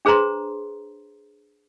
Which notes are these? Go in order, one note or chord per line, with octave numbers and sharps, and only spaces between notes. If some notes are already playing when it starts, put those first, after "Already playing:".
D4 G#4 B4 C5 A#5 C6